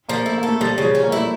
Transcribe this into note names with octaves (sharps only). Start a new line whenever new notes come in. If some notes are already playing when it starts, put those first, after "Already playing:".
F3 A#3
A3 E4
A#3
A4
A3
F3 G3
C#3 G3
F3
G3 C#4
A#3
A3 E4